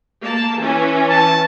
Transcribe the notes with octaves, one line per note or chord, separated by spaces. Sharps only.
A#3 A5
E3 C#4
A5